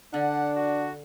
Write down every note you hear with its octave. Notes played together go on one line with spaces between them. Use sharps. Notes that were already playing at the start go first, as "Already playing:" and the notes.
D3 D4 F#5
F#4